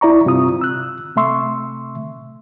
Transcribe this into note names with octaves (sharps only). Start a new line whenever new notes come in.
E4 D5 A#5 C#6
G2 C3 F4 D#6
E6 F#6
C3 A3 E5 C6 C#6 E6